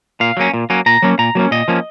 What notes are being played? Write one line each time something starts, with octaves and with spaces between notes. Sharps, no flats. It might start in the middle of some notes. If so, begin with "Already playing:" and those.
A#2 F5
F#3 A#3 C#4
A#2
F#3 A#3 C#4
A#2 A#5
F#3 A#3 C#4
A#2 A#5
F#3 A#3 C#4
A#2 D#5
F3 A#3 C#4